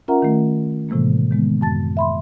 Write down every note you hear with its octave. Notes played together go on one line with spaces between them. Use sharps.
C#4 F4 A#4 E5 F#5 A#5
D#3 A3
A2 C3 E3 G#3 A#3
D#3 G#3 B3
F#2 A5 A6
E5 B5 C6